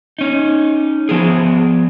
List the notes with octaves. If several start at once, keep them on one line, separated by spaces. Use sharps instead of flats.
C#4 D#4
F3 B3 G#4